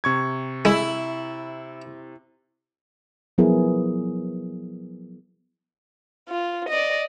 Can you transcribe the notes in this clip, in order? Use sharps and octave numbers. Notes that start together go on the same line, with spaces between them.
C3 C#6 G#6
G#3 E4
F3 F#3 B3 E4 G#4 A#4
F4
D5 D#5